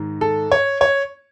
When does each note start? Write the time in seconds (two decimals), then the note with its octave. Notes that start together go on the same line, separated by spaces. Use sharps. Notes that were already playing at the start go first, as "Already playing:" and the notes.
Already playing: G#2 D#3
0.21 A4
0.52 C#5
0.81 C#5